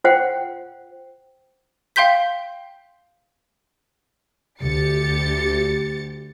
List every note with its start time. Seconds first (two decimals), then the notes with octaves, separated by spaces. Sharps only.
0.04 F4 C5 F#5 G5
1.96 F5 G5 C6 G6 B6
4.61 D2 G4 A6 C#7